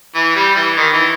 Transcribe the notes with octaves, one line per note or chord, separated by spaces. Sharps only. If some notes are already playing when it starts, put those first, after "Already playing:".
E3
G3
E3
D#3
E3